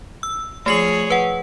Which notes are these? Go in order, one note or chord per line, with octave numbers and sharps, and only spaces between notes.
E6
F3 A3 G#4 C#5 C7 F#7
B4 F#5